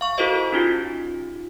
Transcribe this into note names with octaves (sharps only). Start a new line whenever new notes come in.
F5 C#6
E4 F#4 A4 A#4 C5 D#5
C#4 D#4 F4 G4